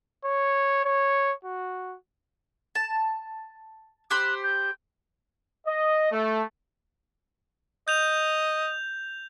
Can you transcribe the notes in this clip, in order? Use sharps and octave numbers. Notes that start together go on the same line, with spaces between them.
C#5
C#5
F#4
A5
G4 C5 B5 F#6
G6
D#5
A3
D#5 G6 F7